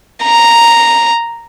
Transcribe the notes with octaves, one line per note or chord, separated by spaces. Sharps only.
A#5